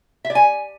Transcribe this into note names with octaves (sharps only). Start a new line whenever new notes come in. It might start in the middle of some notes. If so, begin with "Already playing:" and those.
E5
D5
G#5